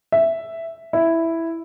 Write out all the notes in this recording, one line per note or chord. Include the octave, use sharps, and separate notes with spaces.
E5
E4